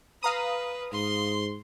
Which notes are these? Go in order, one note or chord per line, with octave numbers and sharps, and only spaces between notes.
B4 F5 A#5 D#6
G#2 C6